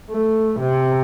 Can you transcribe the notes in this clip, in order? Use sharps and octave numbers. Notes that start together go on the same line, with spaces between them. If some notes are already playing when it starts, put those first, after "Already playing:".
A3
C3